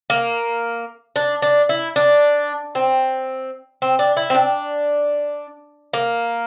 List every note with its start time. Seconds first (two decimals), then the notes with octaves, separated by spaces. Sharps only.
0.10 A#3
1.16 D4
1.42 D4
1.69 E4
1.96 D4
2.75 C4
3.82 C4
3.99 D4
4.17 E4
4.30 C4
4.35 D4
5.93 A#3